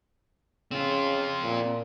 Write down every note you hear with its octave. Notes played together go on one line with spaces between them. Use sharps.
C#3 C4 F4
A#2